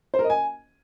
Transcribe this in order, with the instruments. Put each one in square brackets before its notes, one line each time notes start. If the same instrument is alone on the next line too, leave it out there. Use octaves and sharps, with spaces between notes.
[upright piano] C5
A#4
D#5
G#5